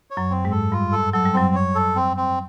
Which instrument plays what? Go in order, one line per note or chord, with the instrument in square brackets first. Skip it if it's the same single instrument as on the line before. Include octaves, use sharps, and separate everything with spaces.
[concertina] C#5
[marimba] F#2 F#3
[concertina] C4
[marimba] G#2 G#3
[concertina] A4
[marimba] G2 G3 [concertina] F4
[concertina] A4
[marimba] F#3 [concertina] A4
[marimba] G3
[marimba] F#2 F#3 [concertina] C4
[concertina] C#5
A4
C4
C4